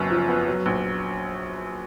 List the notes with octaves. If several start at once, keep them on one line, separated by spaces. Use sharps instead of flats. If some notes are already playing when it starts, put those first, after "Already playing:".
Already playing: F#1 F#2 B3
F3
B3
F#3
A#1